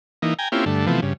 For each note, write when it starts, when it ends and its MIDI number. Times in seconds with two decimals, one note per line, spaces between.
0.22 0.34 52
0.22 0.34 58
0.22 0.34 63
0.39 0.49 79
0.39 0.49 80
0.39 0.49 82
0.52 0.65 58
0.52 0.65 60
0.52 0.65 61
0.52 0.65 64
0.52 0.65 65
0.52 0.65 67
0.66 0.87 43
0.66 0.87 50
0.66 0.87 57
0.87 1.01 48
0.87 1.01 52
0.87 1.01 53
0.87 1.01 57
0.87 1.01 59
1.02 1.13 43
1.02 1.13 49